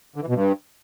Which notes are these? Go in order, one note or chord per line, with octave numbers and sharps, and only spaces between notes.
D3
E3
B2
G2